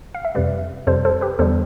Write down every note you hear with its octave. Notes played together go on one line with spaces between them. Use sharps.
F5
E5
F2 C3 G3 B4 D5
F2 C3 G3 A4 C5
A4 C5
G4 B4
E2 D3 G3 A4 C5